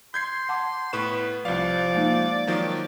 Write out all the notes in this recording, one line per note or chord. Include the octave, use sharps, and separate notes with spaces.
C6 G6 G#6 C7
F#5 A5 D6
A2 B3 B4 C#6 E7
C2 F3 D5 F5
G#3 A#3 D#4
D#3 F3 F#3